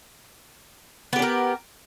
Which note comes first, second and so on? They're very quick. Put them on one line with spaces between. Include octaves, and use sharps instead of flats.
B3 G4 D4 A#4